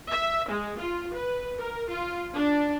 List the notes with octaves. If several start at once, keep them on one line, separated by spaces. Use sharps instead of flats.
E5
G#3
F4
B4
A#4
F4
D4